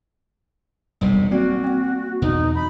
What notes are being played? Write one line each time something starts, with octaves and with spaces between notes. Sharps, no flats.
E1 B1 C3 G3
A#3 C4 F#4 D5
C4 F#5
E2 B2 D#4
B5